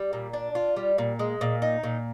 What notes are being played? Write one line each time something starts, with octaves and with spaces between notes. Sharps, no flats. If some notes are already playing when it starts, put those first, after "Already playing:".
Already playing: G3
A#2
D4
F4
G3
A#2
G#3
A#2
D#4
A#2